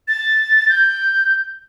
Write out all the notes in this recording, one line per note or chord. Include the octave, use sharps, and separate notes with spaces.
A6
G6